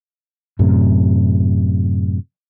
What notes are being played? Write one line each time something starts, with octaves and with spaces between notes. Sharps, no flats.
F#2 A2 C3